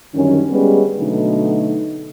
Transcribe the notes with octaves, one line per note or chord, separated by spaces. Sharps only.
F#2 D3 D#3 G3 C#4
G3 G#3 B3 C#4 G#4 B4
B2 D3 F#3 A3 D#4